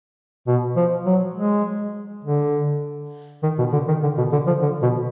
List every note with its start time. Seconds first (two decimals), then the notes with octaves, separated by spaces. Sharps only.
0.48 B2
0.76 F3
1.06 F#3
1.37 G#3
2.25 D3
3.43 D#3
3.59 B2
3.73 D3
3.88 D#3
4.03 D3
4.18 B2
4.33 D3
4.47 F3
4.62 D3
4.83 B2